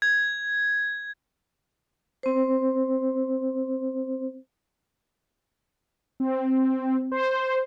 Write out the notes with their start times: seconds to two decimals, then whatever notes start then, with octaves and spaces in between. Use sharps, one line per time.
0.02 G#6
2.23 C4 C5
6.20 C4
7.12 C5